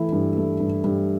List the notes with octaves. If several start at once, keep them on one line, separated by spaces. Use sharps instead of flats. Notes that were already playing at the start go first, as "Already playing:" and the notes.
Already playing: E3 A3 E4
G2
A3
G2
G2